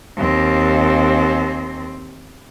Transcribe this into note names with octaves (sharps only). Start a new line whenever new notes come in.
D#2 C4